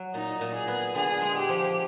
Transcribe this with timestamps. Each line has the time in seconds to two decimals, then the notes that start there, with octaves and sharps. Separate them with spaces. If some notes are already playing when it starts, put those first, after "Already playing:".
Already playing: F#3
0.14 A#2 D#4
0.41 A#2
0.54 G#4
0.68 B3
0.95 D3 G#4
1.22 G#3
1.35 G4
1.49 F3